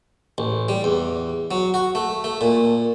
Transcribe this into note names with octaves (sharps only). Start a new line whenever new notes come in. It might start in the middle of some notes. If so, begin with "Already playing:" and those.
A1
G3
E2
F#3
F#4
A3
A3
A#2